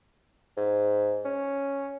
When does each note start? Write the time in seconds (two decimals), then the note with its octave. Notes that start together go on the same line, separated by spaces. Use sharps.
0.57 G#2
1.25 C#4